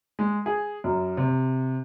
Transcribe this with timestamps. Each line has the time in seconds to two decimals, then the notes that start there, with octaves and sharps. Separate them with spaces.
0.19 G#3
0.46 G#4
0.84 F#2
1.17 C3